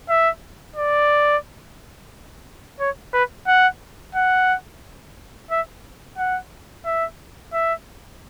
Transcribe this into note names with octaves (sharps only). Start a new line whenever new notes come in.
E5
D5
C#5
B4
F#5
F#5
E5
F#5
E5
E5